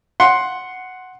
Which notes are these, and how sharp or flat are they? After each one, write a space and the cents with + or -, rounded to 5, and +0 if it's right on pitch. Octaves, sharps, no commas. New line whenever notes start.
F#5 +0 C6 +10